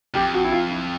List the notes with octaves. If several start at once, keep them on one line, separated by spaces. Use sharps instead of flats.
F2 G4
F#4
E4
F4
E4